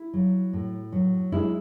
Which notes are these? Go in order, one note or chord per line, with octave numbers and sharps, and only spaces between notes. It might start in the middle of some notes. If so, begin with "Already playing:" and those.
Already playing: E4
F#3
A2
F#3
G#3 E4